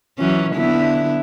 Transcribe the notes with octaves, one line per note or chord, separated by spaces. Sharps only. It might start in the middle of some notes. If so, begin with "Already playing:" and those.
E3 F#3 C#4
D3 B3 E4